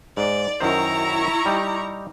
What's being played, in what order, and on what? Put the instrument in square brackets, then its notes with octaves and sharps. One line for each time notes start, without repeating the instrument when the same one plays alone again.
[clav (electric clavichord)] G#2 [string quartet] D5
[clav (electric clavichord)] F#2 D#3 C5 [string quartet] E4 A#5 C#6
[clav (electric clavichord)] G3 D#4 G4